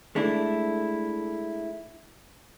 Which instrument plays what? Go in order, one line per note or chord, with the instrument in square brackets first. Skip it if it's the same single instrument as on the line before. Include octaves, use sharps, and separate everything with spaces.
[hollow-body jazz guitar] G#3 A3 D4 E4